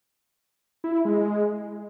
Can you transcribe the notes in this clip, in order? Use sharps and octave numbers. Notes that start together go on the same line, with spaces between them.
E4
E4
G#3